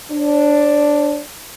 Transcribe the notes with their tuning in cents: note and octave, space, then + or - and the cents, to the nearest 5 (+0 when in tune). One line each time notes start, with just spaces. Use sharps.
D4 +0 C#5 -40